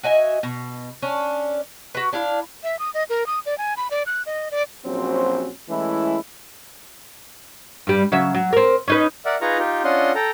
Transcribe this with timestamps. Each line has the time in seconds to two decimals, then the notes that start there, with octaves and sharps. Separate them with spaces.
0.03 F#4 D#5 E5 G#5
0.43 B2
1.02 C#4 D4
1.95 F#4 B4
2.13 D4 E4 F5
2.64 E5
2.79 D#6
2.94 D#5
3.10 A#4
3.27 D#6
3.46 D5
3.58 G#5
3.77 B5
3.91 D5
4.06 F#6
4.26 D#5
4.51 D5
4.85 A#1 F#3 C4 C#4 F#4 C5
5.69 E3 G#3 A3 C#4 E4
7.87 G2 G3
8.12 C#3 F#3 E5
8.34 F#3
8.53 C4 A#4
8.88 C#4 D#4 B4
9.25 A#4 D5 E5 F#5
9.42 D#4 F4 G#4 B4 A#5 C#6
9.59 D#4 F4 G4
9.84 C#4 D4 F4 D#5 F#5 C6
10.15 A4 G5 A#5